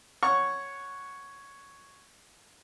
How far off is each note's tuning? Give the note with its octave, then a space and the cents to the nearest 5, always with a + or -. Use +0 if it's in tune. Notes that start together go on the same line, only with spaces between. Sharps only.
C#5 +0 F#5 -5 C#6 +0